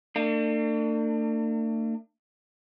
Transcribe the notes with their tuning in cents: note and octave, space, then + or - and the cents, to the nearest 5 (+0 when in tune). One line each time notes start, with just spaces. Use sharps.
A3 +45 D4 +35